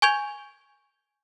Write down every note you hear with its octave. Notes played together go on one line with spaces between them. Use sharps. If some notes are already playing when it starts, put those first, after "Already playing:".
G#5 C#6 G6 G#6 F7